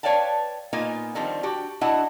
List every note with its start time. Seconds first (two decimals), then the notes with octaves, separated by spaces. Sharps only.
0.03 B4 C#5 D5 F5 G5 A5
0.73 A#2 A#3 B3 D#4 F4 G#5
1.15 D3 D#3 F3 G3 C4
1.43 D4 F#4 G4
1.81 D4 E4 F#4 D#5 F#5